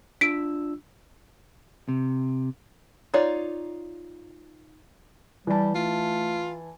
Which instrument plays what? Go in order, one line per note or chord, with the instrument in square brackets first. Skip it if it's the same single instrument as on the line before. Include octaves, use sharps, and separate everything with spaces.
[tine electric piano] D4 F4 E6 [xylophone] B6 D7
[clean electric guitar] C3
[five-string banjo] D#4 F4 C#5 D5
[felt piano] E3 A5 [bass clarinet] G3
[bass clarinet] A3 [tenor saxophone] F4